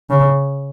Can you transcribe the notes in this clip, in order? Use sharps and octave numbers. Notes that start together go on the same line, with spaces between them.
C#3